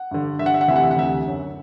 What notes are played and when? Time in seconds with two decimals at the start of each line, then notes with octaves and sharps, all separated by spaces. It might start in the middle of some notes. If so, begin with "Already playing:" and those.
Already playing: F#5
0.11 G2 D3
0.39 G2 D3 E5
0.46 F#5
0.54 E5
0.61 F#5
0.68 D2 C3 E3 E5
0.76 F#5
0.84 E5
0.91 F#5
0.96 D2 C3 E3 E5
1.24 F#2 D3